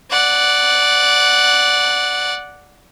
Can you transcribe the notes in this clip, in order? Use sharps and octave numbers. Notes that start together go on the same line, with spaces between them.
D5 F#5